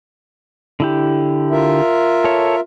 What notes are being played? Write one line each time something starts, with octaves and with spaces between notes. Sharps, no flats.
D3 E4 G4
F4 A#4 E5
A4 C#5